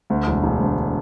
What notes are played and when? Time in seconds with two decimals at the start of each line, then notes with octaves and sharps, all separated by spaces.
0.10 D2
0.27 E1
0.43 E1
0.60 D2